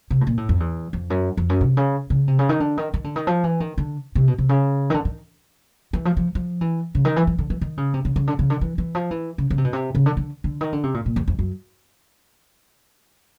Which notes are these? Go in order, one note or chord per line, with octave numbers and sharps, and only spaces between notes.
C3
A2
A#2
A2
F2
E2
F2
F#2
F2
F#2
C3
C#3
C#3
C3
C#3
D#3
D3
D#3
D#3
D3
D#3
F3
E3
D#3
D3
C3
B2
C3
C#3
D#3
D3
D#3
E3
F3
F3
F3
E3
C#3
D#3
E3
E3
D3
E3
D#3
C#3
C3
C#3
C#3
D3
C#3
D3
E3
E3
F3
E3
C#3
C#3
C3
B2
C3
C#3
D3
D3
D3
D#3
D3
C3
A#2
A#2
E2
F2
F#2